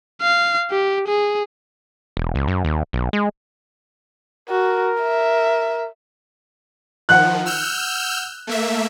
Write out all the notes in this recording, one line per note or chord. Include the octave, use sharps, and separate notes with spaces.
F5
G4
G#4
E1
C#2
F#2
D#2
B1
G#3
F#4 A#4
E5
D#3 F3 F#5 F#6
E6 F6 G6
A3 A#3 E5